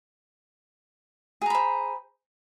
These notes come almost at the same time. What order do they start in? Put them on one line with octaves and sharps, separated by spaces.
G#4 A#5 B5 C5